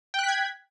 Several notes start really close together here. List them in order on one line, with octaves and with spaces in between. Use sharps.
G5 F#6 B6 G#6